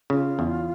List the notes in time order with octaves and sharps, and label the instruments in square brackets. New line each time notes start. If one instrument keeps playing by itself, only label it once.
[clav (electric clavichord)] C#3 [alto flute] F4
[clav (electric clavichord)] E2